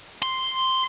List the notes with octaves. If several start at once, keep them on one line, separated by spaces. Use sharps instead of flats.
C6